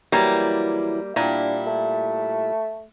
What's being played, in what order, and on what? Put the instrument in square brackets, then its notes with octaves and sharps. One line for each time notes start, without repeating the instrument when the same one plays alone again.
[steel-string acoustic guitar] E3 F#3 E4 [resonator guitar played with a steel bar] G3 A#3
[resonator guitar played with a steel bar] A#2 [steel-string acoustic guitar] G3 E4 [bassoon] D4
[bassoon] A3